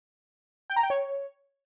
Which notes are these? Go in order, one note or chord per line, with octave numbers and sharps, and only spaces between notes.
G5
A#5
G5
C#5